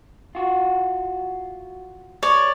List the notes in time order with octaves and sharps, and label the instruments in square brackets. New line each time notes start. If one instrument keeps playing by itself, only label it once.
[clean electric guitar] F4 F#4
[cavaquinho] C#5 D5